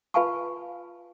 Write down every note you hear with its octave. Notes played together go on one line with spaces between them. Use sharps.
F4 B4 F5 G#5 A5 C#6